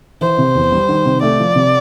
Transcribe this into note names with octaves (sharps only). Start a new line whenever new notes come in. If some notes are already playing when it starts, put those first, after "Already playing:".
E3 C5
C3
E2
G3
D#3
C3
A3 D5
F3
C3